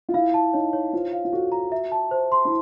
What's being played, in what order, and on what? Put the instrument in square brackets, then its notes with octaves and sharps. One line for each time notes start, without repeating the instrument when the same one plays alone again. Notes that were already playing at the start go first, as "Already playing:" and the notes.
[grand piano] F4
[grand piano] E4 [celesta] F5
[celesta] A5
[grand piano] D#4 [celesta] C#5
[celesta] C#5
[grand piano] F4 [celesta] C5
[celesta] F5
[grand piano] F4
[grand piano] F#4 [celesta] A4
[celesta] A#5
E5
A5
C5
C6
[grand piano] E4